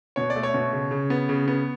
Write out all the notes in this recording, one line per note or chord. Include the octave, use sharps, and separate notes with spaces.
B2 C#5
D5
A3
C#5
B2
C#3
C#3
B3
C#3
B3